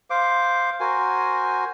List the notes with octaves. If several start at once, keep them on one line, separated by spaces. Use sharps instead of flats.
C5 F5 D6
F#4 A#4 C5 G#5